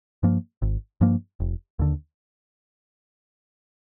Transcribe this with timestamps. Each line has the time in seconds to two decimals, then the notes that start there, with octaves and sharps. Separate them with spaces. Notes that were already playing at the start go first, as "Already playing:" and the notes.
0.23 G2 F3 A#3
0.62 G#1
1.01 G2 F3 A#3
1.40 F1
1.79 D#2 D3